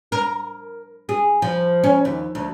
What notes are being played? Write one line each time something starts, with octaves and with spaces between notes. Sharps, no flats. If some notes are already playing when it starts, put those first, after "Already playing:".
A#4
G#4
F3
C#4
D#2
D2